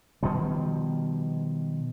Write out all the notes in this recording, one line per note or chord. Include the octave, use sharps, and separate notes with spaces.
B2 D#3 F3 G3